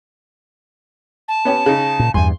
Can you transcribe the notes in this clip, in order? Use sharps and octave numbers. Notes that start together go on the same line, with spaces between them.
A5
B3 C#4 G4
C#3 D#4
A#2
E2 G2 G#5 C6